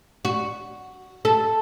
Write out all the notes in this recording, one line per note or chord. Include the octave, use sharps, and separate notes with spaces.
F#4
A4